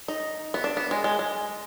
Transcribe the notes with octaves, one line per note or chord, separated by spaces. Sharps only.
D#4
B3
D4
B3
G#3
G#3
G#3